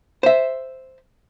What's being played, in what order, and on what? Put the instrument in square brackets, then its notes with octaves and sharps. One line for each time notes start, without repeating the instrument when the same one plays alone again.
[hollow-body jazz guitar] C5 E5